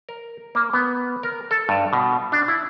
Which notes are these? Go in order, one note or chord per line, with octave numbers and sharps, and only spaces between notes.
A#4
A#3
B3
A#4
A4
G2
B2
D4
E4